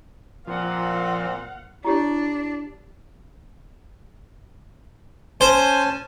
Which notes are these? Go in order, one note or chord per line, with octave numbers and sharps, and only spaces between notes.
A#2 F3 C4 F5 F#5
D4 E4 G4 C#5
C#4 C5 G#5 A5